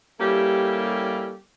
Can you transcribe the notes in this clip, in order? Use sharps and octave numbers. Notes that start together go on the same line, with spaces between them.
G3 A#3 C#4 E4 G4 A4